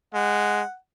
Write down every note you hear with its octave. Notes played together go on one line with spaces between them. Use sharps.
G#3 F#5